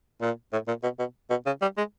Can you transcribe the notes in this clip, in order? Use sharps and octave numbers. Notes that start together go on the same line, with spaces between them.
A#2
A2
A#2
B2
B2
B2
C#3
G3
G#3